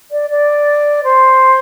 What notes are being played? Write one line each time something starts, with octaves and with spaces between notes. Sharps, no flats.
D5
D5
C5